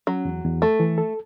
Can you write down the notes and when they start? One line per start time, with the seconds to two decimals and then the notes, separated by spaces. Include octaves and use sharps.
0.07 F#3 C#4
0.25 E2
0.44 E2
0.62 A3 A4
0.80 E3
0.98 A4